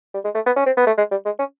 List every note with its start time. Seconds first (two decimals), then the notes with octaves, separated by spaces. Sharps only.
0.14 G3
0.24 G#3
0.35 A3
0.46 B3
0.56 C#4
0.66 C4
0.77 B3
0.86 A3
0.98 G#3
1.11 G3
1.25 G#3
1.39 C#4